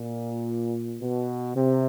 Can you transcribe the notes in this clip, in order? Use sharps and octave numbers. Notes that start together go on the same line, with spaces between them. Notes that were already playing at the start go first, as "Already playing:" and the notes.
Already playing: A#2
B2
C3